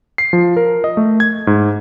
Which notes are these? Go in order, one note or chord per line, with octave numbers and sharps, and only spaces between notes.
C7
F3
A#4
D#5
A3
G#6
G#2